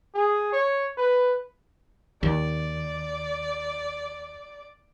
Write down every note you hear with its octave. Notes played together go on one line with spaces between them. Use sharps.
G#4
C#5
B4
D#2 D5